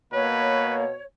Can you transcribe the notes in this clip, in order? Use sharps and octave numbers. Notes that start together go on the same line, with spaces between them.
B2 A#3 B4 C#5